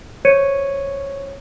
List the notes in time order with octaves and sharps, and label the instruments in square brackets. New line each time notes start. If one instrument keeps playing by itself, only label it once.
[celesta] C5 C#5 C#6 G#6 C#7 D#7